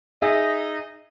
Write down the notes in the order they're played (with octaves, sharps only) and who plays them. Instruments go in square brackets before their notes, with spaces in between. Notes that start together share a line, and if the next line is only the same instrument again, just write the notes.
[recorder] D#4 [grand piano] G#4 [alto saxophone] D#5 [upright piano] E5